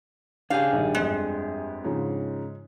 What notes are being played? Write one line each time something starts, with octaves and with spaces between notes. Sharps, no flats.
C#3 D4 G4 G#4 F5
A#1 D#3 G3
G1 F2 G#3
G#2 C#3 F3